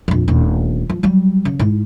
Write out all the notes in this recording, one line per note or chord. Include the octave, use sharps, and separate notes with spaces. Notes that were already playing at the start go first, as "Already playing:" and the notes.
A#1 F2
D#1 D2
F3
F#3 G3
C#3
G#2 E4